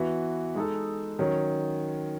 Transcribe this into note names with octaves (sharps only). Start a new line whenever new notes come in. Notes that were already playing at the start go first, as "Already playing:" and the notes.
Already playing: E3 B3 F#4 B4
G#3 D#4 A4
D#3 F#3 C#4